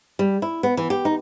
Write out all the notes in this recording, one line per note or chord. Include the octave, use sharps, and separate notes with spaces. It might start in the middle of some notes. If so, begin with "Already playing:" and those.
G3
E4
B3
E3
G4
D#4